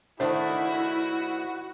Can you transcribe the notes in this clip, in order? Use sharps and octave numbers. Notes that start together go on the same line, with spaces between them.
D#3 A3 D4 E4 F#4 C5